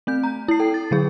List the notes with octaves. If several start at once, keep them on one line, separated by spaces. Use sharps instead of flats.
A3 C4 G6
A#5
E4 C7
A4 G5
A6
D3 F#3 G#4